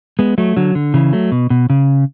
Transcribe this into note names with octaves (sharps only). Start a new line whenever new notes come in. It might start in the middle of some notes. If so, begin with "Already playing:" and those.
G#3 B3
F#3 A3
D3 F#3
D3
C#3 E3
F#3 A3
B2
B2
C#3